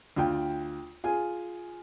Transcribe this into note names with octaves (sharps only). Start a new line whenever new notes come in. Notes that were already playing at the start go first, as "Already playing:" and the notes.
D2 F4 G5
F4 G#4 G#5